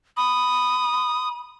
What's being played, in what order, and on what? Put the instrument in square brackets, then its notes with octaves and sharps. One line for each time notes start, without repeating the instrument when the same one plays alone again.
[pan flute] B5 [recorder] D#6